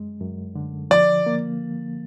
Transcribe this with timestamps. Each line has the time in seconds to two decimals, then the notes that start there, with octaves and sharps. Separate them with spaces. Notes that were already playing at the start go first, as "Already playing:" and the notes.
Already playing: F#2 G#3
0.20 F#2
0.55 D3
0.90 F3 D5
1.26 A#3